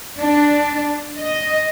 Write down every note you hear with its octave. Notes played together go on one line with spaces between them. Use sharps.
D4
D#5